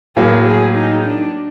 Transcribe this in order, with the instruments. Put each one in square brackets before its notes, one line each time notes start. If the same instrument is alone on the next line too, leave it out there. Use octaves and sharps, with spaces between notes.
[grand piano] A2 F#3 A#3 [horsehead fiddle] G#4
[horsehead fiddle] G#4
D#4
D4